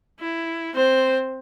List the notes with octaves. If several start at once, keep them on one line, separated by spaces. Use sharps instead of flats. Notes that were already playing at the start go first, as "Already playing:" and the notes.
E4
C4 C5